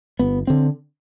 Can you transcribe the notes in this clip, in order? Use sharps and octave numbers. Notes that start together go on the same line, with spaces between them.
G1 B3
D3 C4